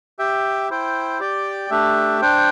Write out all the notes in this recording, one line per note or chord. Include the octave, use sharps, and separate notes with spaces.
G4 E5 G5
E4 C5 G5
G4 D5 G5
A3 D4 G4 E5
D4 C5 G5